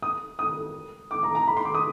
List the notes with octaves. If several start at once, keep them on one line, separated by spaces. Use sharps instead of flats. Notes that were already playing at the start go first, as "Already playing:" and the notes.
D#6
D#6
D6
A#5
A#5
B5
C6
D6
D#6